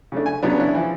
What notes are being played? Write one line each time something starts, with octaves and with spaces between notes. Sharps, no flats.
C#3 A3 D4
G#5
C#3 F#3 B3 D4
C#4 D4 E4
E3 F3